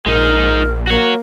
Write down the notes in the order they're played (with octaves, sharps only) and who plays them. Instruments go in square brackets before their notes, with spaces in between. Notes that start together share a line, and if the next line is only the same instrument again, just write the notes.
[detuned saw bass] A#1 [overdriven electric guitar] G#3 D#4 [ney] A#4
[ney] A#3 [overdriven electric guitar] F#4 C#5